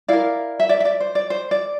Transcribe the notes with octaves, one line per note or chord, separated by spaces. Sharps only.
E4 A#4 D5 F5
E5
D5
E5
D5
C5
D5
C5
D5